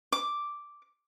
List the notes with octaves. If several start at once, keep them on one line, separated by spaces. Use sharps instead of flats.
D6